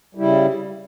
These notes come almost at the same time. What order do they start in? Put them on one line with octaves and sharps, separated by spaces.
G3 E4 C#3